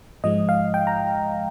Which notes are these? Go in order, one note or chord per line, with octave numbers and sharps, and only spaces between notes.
G#2 F3 G#3 D#5
F5
G5
A#5